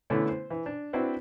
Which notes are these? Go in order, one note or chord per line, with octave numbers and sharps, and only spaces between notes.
D3 E3 A3 B3 C#4 E4
C5
E3
D4
C4 D4 E4 F#4 B4 C5